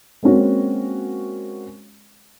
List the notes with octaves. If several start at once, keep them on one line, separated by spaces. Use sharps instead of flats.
G#3 A#3 C4 C#4 F#4